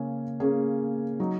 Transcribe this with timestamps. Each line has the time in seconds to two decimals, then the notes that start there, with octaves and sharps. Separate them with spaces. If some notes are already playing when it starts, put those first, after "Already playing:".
Already playing: C#3 A#3 C#4 G#4
0.40 C#3 A#3 C#4 G#4
1.20 F#3 D#4